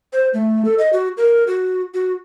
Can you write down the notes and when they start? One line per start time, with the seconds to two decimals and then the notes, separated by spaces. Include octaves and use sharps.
0.13 C5
0.34 A3
0.65 A4
0.78 D#5
0.93 F#4
1.17 A#4
1.47 F#4
1.94 F#4